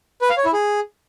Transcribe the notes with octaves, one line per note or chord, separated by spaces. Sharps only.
B4
F5
C#5
E4
G#4